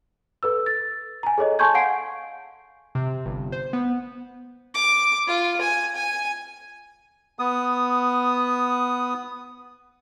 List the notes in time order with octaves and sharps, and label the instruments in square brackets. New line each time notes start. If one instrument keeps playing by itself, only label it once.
[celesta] A4 B4 E6
A6
G#5 A#5
G#4 A4 C#5 D#5
G#5 A5 C6 C#6 G6 G#6
F5 F#5 G#5 C7 D7
[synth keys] C3
G1
C5
B3
[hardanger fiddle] D6
F4
G#5
G#5
[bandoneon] B3 D#6